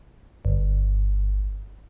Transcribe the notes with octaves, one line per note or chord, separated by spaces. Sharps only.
G1